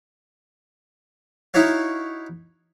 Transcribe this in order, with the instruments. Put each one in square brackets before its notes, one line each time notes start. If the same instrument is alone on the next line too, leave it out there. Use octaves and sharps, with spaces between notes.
[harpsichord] D#4 E4 F#4 C#5 F5